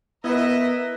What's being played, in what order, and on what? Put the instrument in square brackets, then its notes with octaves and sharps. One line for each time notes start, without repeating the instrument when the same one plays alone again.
[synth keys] B3 [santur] E4 B4 [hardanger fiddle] A#4 E5 [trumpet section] D#5